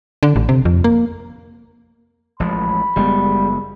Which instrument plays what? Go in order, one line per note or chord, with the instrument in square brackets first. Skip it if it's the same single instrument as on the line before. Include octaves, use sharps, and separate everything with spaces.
[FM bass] D3
A1
C3
F2
A#3
[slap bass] A1 F3 G#3 [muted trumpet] B5
[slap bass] F#1 G#3 B3 [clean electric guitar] G3